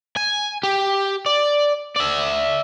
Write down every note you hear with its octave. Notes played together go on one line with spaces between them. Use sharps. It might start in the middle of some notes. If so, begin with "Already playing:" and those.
G#5
G4
D5
D5 E5